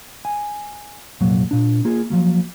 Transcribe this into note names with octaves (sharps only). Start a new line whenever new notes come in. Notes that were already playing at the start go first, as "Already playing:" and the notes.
G#5
C2 F2 A#2 F#3
A#2 D4
A#3 F4 G#4
F3 F#3 A#3